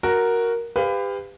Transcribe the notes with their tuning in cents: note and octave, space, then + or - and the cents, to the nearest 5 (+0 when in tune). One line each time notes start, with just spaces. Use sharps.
F#4 +0 A#4 +0
G4 +30 B4 +25 F5 +0